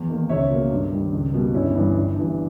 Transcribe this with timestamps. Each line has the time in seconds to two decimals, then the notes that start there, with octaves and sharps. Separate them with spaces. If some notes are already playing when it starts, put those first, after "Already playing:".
Already playing: E2
0.09 D#3 A#3
0.29 C#2 C#5 E5
0.50 B2 A#3
0.71 G2
0.92 D#3 G3
1.12 C#2
1.34 B2 G3 A#3
1.54 G1 C#4 E4
1.75 G2 E3 G3
1.96 G1
2.16 G2 E3